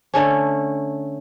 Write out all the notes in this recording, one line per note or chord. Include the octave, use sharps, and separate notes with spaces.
D3 A3 C#4